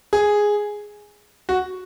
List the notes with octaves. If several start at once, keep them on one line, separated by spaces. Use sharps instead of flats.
G#4
F#4